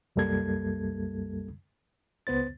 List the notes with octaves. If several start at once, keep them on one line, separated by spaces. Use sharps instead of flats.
C2 F#2 G3 A#3 A4 G#6
C#2 B3 C5 A6